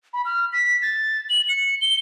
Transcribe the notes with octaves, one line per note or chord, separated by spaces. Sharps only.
B5
F6
B6
A6
F#7
C#7
G7